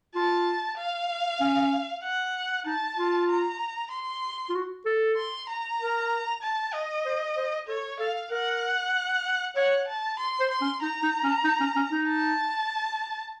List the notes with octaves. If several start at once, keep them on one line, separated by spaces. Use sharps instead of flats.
F4 A5
F5
C#4
F#5
D#4 A5
F4
A#5
C6
F4
F#4
A4
C6
A#5
A#4
A5
D#5
C5
C5
A4 C#5
A4 F5
A#4 F#5
C#5 F#5
A5
C6
C5
C6
C#4
D#4 A#5
D#4
C#4
D#4
C#4
C#4
D#4
A5